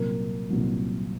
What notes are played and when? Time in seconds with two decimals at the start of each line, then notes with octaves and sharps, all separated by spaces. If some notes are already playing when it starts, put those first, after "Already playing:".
Already playing: C2 A#2 F#3 A#4
0.50 C2 A#2 F#3